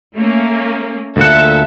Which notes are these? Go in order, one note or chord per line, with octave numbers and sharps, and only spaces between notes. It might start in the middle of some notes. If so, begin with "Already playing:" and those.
A3 A#3 C#4
D2 A#2 A4 E5 F#5